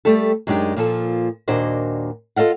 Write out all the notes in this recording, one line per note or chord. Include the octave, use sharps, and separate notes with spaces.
G3 A3 G4 A4
F#2 G#3 D4 D#4 G4
A#2 F3 A4
D#2 A#2 D4 F#4 C5 D#5
F4 A4 D#5 F5 F#5